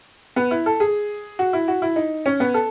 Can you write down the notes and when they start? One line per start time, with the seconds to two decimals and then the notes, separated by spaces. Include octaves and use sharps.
0.36 B3
0.51 E4
0.66 A4
0.80 G#4
1.39 F#4
1.53 E4
1.68 F#4
1.82 E4
1.96 D#4
2.26 C#4
2.40 B3
2.54 A4